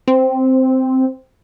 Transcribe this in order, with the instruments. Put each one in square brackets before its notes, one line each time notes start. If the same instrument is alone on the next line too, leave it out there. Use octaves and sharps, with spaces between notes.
[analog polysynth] C4